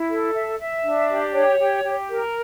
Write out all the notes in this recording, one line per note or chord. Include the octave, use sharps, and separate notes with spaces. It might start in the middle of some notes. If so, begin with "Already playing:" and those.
Already playing: E4
A4
E5
E5
D4
G4
C#5
G4
G4
A#4